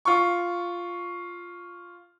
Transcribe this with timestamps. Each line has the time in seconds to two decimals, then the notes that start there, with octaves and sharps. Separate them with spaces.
0.05 F4 C#6